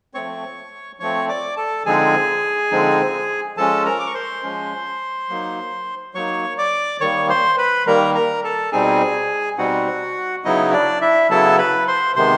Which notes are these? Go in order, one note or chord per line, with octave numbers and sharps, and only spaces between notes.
F3 A3 C4 C#5 C#6
F3 A3 C4 C#5 C#6
D5 D6
A4 A5
D3 F3 G#3 C4 D#4 G#4 G#5
D3 F3 G#3 C4 D#4
F3 G#3 C#4 A4 A5
A#4 A#5
D6
C#6
C5 C6
F3 G#3 C#4
F#3 A#3 D#4
F#3 A#3 D#4 C#5 C#6
D5 D6
D#3 G3 A#3 C#5 C#6
C5 C6
B4 B5
D#3 G3 A#3 A#4 A#5
A#4 A#5
A4 A5
B2 G3 C4 D#4 G#4 G#5
B2 G3 C4 D#4 F#4 F#5
C#3 F#3 B3 D#4 E4 D#5
D4 D5
E4 E5
C#3 F#3 B3 E4 A4 A5
B4 B5
C5 C6
C3 D#3 G#3 B3 C5 C6